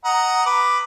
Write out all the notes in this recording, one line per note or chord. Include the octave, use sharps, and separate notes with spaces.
D#5 F#5 A#5
B4 D6